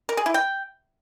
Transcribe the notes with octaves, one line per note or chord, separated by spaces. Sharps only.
A#4
G#4
E4
G5